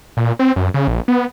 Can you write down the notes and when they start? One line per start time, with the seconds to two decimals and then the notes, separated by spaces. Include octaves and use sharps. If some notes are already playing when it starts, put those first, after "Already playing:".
0.17 A#2
0.39 C4
0.56 F#2
0.74 C#3
0.88 A#1
1.08 B3